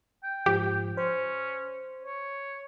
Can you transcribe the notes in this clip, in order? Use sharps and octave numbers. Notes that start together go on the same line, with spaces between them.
G5
G#2 F3 G4
C#4 C5
C#5